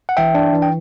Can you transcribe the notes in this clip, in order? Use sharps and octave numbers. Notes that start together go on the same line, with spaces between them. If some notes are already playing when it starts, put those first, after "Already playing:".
F#5
E3 E5 G5
D4
E3
G5